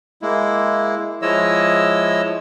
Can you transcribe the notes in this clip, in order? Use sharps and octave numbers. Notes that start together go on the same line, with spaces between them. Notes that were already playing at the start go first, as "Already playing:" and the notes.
G#3 A#3 E4
F3 G#3 E4 C#5 D#5 E6